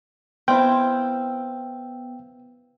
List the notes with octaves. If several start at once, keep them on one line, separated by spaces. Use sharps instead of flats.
B3 C4 E4 G5